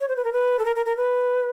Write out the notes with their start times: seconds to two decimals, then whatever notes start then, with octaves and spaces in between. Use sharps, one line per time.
0.01 C#5
0.08 C5
0.16 B4
0.25 A#4
0.33 B4
0.59 A4
0.65 A#4
0.76 A#4
0.86 A#4
0.97 B4